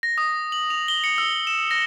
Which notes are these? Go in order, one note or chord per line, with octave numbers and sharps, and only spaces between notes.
A#6
D#6
F#7
F7
G7
C#7
E6
E7
A#6